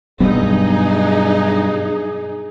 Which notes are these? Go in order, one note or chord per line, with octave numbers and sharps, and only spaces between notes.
G2 B2 F#3 B3 D#4 G#4